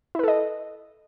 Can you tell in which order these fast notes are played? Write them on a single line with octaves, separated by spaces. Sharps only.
E4 B4 A4 D#5